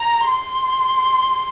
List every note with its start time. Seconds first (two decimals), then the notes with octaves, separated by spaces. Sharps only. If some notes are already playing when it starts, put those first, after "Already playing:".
Already playing: A#5
0.25 C6